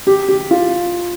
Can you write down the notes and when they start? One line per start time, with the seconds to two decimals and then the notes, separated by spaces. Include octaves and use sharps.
0.07 G4
0.29 G4
0.51 F4